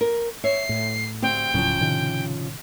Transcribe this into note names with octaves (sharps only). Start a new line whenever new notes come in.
A#4
C#5 E5 C7
A2
D2 C4 G4 G5
D1 A2 C#3 F3 F#3
A2 C3 D#3